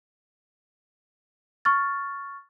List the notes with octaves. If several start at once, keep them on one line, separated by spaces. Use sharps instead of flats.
C#6 F6 A6